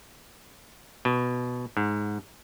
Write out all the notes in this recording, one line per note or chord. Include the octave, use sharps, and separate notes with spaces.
B2
G#2